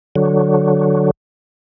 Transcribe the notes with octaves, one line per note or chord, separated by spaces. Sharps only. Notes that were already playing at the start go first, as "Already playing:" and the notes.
D3 F#3